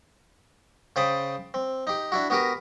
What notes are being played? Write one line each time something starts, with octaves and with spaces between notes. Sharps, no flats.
C#3 C5 G5 A5 B5 D#6
C4
D#4 G4
D4 E4 F#4
B3 F#4 G4 A#4 B4